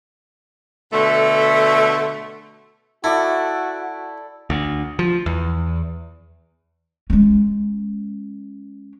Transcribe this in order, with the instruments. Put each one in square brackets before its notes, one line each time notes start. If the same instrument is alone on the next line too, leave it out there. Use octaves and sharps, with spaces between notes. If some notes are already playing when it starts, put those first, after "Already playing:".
[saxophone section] B2 D3 A3
[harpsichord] E4 [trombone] F#4 [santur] A4 D5 B5
[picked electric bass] D2
F3
E2
[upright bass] G#3 C#4